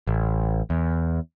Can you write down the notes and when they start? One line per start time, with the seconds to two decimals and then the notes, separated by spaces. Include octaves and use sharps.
0.07 A1
0.70 E2